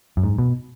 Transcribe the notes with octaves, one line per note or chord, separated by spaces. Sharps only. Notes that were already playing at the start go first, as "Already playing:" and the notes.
F#2
G#2
B2